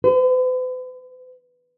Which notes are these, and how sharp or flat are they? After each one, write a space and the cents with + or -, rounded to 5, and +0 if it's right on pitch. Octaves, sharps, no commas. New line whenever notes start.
B4 +45